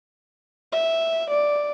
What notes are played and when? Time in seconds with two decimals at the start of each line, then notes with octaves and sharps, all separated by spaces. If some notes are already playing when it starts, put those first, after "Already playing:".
0.72 E5
1.30 D5